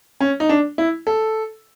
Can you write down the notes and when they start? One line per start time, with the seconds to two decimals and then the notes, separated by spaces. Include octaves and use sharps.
0.20 C#4
0.40 D#4
0.49 D4
0.78 E4
1.07 A4